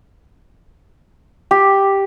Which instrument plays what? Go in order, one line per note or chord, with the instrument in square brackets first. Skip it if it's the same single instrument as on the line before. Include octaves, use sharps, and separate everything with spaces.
[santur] G4